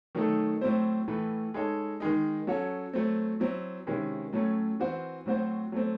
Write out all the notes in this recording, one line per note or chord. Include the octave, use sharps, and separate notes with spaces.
D#3 F#3 A3 D#4 A4
A2 F#3 C4 E4 C5
A2 E3 A3
G#3 D#4 A4 C#5
D#3 G#3 D#4
F#3 C#4 F#4 A4 C#5
F#3 A3 C4
F#3 C4 E4
C3 D#3 G#3 C#4 E4
A2 F#3 A3 C#4
E3 C4 F#4 C5
A2 F#3 C4 F#4 C5
F#3 A3 C4